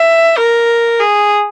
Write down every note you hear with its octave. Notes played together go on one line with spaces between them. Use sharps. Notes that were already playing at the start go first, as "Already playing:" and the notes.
Already playing: E5
A#4
G#4